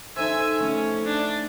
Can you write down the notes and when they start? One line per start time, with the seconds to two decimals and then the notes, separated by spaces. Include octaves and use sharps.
0.16 D#4 A4 C5 E5 G#5
0.60 A3 C#4
1.05 D4